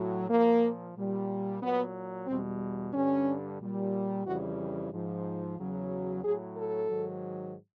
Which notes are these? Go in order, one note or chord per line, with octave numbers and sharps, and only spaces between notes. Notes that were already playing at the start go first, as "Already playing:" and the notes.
Already playing: A2 F#3
A#2 F3 A#3
A#2 G3
A#2 F#3 B3
E2 B2 G3 C4
G2 D3 G3 C#4
A#2 G3
F2 C#3 E3 G3 F#4
G#2 F3
E2 C#3 F#3
A2 F#3 G#4
A4
G#2 D#3 F#3